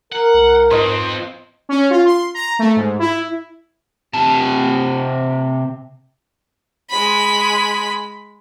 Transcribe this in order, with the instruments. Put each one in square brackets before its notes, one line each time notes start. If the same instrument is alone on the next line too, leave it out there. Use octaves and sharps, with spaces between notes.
[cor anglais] A#4 [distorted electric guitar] F#5
[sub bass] C2
[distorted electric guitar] F2 C4 [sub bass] G#2 [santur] C5 D#5
[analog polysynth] C#4
F4
C6
A#5
A3
G#2
E4
[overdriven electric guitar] C3 A5
[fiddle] G#3 B5